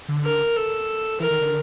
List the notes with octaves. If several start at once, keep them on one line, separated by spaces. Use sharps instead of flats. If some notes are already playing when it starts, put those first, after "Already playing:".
D3
A#4
A4
E3 A#4
D#3
D3